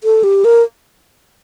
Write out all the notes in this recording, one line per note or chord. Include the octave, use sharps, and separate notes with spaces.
A4
G4
A#4